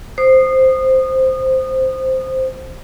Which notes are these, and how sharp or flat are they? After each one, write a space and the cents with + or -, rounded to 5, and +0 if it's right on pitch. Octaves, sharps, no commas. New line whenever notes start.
C5 +0 D#6 -25